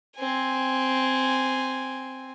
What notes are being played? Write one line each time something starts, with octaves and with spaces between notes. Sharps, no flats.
C4 G#5